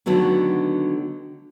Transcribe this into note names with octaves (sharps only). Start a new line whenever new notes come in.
D3 D#3 F#3 A3 B3